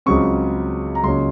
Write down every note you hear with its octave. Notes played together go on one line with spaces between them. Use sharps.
C#2 C#3 F#3 C4 C#6
A#5
C#2 C#3 F#3 A#3 C#4 C6